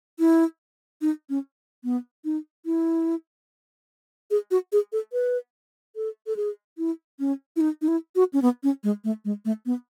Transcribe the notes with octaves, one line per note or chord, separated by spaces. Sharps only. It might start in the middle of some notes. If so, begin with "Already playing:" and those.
E4
D#4
C#4
B3
D#4
E4
G#4
F#4
G#4
A4
B4
A4
A4
G#4
E4
C#4
E4
D#4
D#4
E4
F#4
C#4
B3
C#4
G#3
A3
G#3
A3
B3